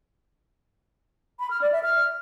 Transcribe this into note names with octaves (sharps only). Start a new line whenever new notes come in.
B5
F6
D5
E5
F6